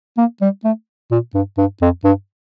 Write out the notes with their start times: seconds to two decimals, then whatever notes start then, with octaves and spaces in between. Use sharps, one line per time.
0.17 A#3
0.41 G3
0.64 A3
1.11 A#2
1.34 G2
1.58 G2
1.82 F2
2.04 G2